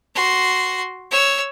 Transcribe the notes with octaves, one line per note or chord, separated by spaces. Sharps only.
F#4 C6
C#5 E6